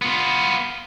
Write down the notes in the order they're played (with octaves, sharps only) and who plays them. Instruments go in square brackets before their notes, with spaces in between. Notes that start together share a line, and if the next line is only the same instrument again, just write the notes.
[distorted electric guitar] B3 F4